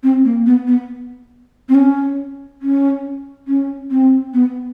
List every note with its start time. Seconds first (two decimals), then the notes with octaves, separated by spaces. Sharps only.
0.03 C4
0.25 A#3
0.46 B3
0.67 B3
1.69 C4
1.75 C#4
2.62 C#4
3.47 C#4
3.91 C4
4.33 B3